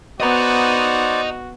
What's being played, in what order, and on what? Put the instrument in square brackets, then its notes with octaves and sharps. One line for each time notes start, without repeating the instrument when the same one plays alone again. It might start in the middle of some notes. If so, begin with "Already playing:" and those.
[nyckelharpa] B3 [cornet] F#4 [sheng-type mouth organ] C5 D5 [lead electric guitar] D#5 A#5